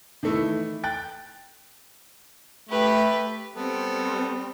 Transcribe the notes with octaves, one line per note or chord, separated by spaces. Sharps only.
D#3 E3 A3 E4
G5 F#6 A6
A3 G4 B4
G3 B3 C4 A4